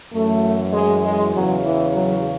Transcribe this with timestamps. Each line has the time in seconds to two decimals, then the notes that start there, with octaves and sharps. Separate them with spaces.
0.13 F#2 E3 A3
0.73 G#3
1.04 G#3
1.34 E2 C#3 E3 F#3
1.63 E3
1.93 F#3